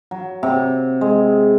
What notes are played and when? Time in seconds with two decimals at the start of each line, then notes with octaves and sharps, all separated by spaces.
0.11 F#3
0.43 C3
1.01 G#3